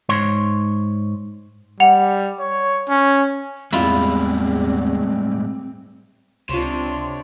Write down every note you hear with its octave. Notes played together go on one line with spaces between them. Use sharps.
G#2 C#5 C6
G3 F#5 F7
C#5
C#4
E2 A2 G3 G#3 C4 E4 F4
C#2 C3 D4 F4 C#5 C6